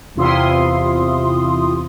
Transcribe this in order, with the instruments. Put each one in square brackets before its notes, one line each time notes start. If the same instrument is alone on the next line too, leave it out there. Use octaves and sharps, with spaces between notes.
[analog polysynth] E2 C3 E4 F4 C6 D#6